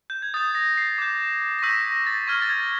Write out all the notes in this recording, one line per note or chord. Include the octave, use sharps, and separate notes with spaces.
G6
G#6
D#6 G6 A6
A#6
C7
D6 G6
A#6
C#6 E6 G6 B6
A#6
A6
C#6 F6 G#6
A6
G#6